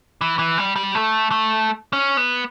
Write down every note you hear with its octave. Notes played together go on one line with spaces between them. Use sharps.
E3
E3
G3
G3
A3
A3
C#4
B3